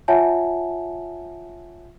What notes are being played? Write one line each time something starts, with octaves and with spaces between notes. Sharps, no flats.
F4 C#5 E5 F#5 G#5 A5